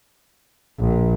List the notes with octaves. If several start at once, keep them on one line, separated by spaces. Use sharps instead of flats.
A#1